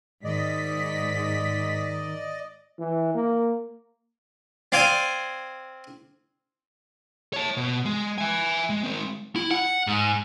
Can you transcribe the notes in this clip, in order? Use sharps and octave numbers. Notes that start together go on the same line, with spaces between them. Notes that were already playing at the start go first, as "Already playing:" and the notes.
G#2 D#3 D5 D#5 B6
E3
A#3
C4 D5 F5 G#5
C#5 A5
B2
G#3
E5 G#5
G#3
G#3 C4
E4
F#5
G#2